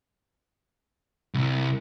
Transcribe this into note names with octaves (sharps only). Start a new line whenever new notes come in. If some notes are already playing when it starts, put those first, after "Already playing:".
C2